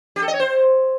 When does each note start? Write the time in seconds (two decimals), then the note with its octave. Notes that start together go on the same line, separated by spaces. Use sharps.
0.16 G4
0.22 A4
0.28 D#5
0.34 C#5
0.40 C5